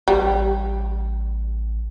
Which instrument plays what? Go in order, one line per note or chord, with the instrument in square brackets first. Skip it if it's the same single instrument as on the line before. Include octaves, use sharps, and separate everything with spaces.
[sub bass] A1 [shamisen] G3